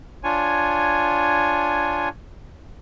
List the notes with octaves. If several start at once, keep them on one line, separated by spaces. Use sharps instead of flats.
D4 F4 C#5 G#5